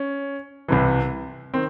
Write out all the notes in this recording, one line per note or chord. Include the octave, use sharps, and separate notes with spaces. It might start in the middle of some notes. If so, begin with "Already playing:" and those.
Already playing: C#4
C2 C3 E3
D#3 C4